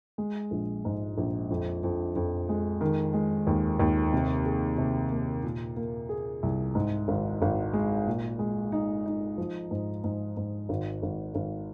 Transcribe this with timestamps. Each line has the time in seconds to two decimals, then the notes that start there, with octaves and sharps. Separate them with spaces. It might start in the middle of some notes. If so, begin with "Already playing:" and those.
0.18 G#3
0.51 A#1
0.85 G#2
1.18 A#1
1.50 F2
1.83 F2
2.16 F2
2.49 G#3
2.81 D#3
3.14 G#3
3.47 D#2
3.80 D#2
4.13 C3
4.46 G#4
4.78 C3
5.12 A#3
5.43 A#2
5.76 A#3
6.09 G#4
6.43 C2
6.75 G#2
7.08 G#1
7.42 G#1
7.73 G#3
8.06 A#2
8.39 G#3
8.72 D#4
9.06 D#4
9.38 F3
9.71 G#2
10.04 G#2
10.37 G#2
10.69 G#1
11.03 G#1
11.35 G#1